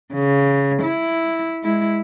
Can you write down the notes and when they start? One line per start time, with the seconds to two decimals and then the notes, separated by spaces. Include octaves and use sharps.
0.14 C#3
0.83 E4
1.63 G#3 E4